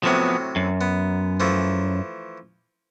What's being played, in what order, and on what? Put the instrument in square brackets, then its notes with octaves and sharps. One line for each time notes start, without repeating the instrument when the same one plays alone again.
[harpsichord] A2 C3 F#3 [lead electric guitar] F3 B3
[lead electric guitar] F#2
[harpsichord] B3
E3 F3 A3